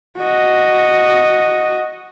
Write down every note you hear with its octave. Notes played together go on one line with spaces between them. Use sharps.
F#4 D#5